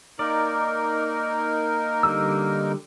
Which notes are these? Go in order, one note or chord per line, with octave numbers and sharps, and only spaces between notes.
A#3 D#4 A#4 D5
D3 G3 E6